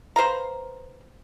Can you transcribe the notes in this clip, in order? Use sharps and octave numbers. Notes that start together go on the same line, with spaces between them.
B4 C5 F5 A#5